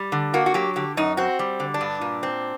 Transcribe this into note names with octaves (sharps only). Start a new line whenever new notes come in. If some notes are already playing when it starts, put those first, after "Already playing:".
Already playing: G3
D3
A#3 F#4
F#4
F#3 G4
D3 G4
F#2 D#4
C4 F#4
G3
D3
D4
G2
A#2
C4